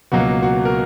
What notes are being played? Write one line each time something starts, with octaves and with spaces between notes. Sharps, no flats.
C#2 B2 F#3 A#3 F#4
F#4
A#4